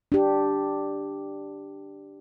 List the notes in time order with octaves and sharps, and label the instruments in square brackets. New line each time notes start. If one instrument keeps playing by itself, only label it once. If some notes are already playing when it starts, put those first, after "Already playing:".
[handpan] D4 G4